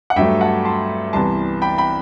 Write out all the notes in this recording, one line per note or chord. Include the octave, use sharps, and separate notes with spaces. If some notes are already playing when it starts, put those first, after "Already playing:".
F#5
G2 F#3 A3 E5 G5
F#5 A5
A5 C6
C2 C3 E3 B3 A5 C6
G5 B5
G5 B5